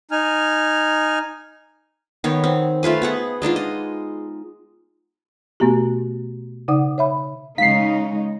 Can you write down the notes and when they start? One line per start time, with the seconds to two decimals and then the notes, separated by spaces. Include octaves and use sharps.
0.11 D#4 G#5 F6
2.24 D#3 B3 C#5
2.44 C4
2.83 A3 F4 B4 G#5
3.02 B3 G#4 F#5
3.42 G#3 D4 D#4 F4
3.56 D#5
5.60 B2 A3 B3 F#4 G4
6.68 C#3 D#4 D5 F#5 D6 D#6
6.98 C#5 E5 B5
7.58 C#3 G#3 D#4 F5 B6 C7